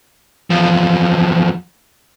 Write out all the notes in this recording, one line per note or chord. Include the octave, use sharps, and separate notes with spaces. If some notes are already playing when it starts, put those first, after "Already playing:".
E2 F3